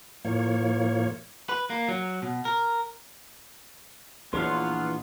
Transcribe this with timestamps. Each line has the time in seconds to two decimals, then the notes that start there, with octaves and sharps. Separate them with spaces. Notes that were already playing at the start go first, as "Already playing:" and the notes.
0.25 A2 F3 A#3 C#5
1.49 B4
1.70 A#3
1.89 F#3
2.22 B2
2.45 A#4
4.33 A#1 E3 F#3 B3 D4 F4 F5 C6